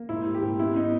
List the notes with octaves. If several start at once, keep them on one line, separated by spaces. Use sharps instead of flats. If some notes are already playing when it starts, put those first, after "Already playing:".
Already playing: A#3
G#2 E4
G3
G4
G#2
B3 E4
B3 D#4